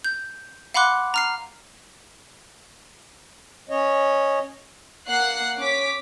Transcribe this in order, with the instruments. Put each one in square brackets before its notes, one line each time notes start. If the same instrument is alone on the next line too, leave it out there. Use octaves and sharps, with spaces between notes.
[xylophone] G6
F5 F#5 B5 C6 D6 F#6
A#5 F6 C7
[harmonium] C#4 C#5 D#5
[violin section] A#3 F#5 F#6 C7
C#4 D6 B6